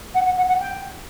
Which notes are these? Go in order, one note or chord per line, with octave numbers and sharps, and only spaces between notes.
F#5
F#5
F#5
F#5
G5